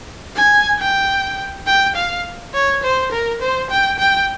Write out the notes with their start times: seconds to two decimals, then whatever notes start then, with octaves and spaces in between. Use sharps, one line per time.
0.36 G#5
0.79 G5
1.67 G5
1.96 F5
2.54 C#5
2.83 C5
3.12 A#4
3.41 C5
3.70 G5
3.99 G5